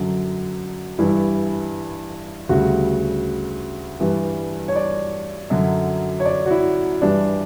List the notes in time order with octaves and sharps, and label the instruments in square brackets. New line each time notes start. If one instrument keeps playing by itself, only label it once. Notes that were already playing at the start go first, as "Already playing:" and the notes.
Already playing: [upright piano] F#2 D3 F#3
G2 E3 G3 E4
D2 C#3 G3 F#4
G2 E3 G3
C#5
D5
F#2 D3 F#3
C#5
D5
F#4
E4
G2 E3 G3 D4